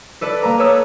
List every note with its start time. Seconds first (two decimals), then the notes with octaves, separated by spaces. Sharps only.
0.21 A4 B4 D5
0.43 A#3 B4 A#5
0.59 A4 B4 C#5 D#6 E6